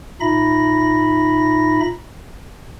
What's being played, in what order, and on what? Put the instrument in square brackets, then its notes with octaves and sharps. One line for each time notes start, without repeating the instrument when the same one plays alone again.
[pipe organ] A#2 D#4 E5 B5 A#6